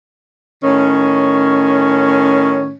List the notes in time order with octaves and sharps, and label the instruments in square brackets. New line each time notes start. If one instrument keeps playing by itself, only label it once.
[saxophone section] A2 D#3 C#4